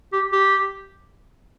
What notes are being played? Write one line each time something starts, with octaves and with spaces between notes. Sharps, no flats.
G4
G4